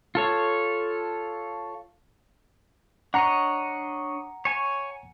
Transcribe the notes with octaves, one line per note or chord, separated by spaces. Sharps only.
F4 A4 C#5
D4 C#5 D#5 F#5 A#5
C#5 G#5